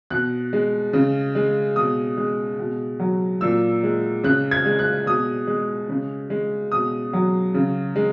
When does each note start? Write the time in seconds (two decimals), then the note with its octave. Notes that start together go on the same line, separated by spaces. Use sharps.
0.10 B2 F#6
0.53 G#3
0.93 C#3
1.35 G#3
1.76 B2 D#6
2.17 G#3
2.59 B2
3.00 F#3
3.41 A#2 E6
3.83 G#3
4.24 C#3 F#6
4.51 G#6
4.66 G#3
4.79 F#6
5.06 B2 D#6
5.47 G#3
5.89 C#3
6.30 G#3
6.72 B2 D#6
7.13 F#3
7.54 C#3
7.96 G#3